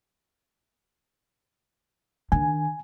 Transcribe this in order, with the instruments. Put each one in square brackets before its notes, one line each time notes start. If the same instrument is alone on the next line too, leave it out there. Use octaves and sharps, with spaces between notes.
[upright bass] D#3 D4 [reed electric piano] G#5